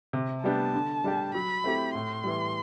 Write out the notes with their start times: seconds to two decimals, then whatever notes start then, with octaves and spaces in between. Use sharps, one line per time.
0.13 C3
0.44 G3 B3 D4 G4 A5
0.74 D3
1.04 G3 D4 G4
1.34 F#3 B5
1.64 A3 C4 E4 G4
1.94 A2 C6
2.24 E3 G3